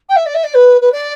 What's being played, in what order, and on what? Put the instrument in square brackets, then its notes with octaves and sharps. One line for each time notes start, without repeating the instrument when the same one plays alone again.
[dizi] G5
E5
D5
E5
D5
B4
B4
D5